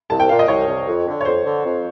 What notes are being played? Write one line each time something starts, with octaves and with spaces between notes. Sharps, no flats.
C2 A5
G5
A#2 F5
D#5
C2 C#5
C2
F2
D3
C#5
F2 C5
D3
F2